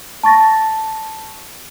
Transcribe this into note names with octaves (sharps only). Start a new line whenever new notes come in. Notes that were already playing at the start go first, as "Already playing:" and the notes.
A5 C#6 A6 A#6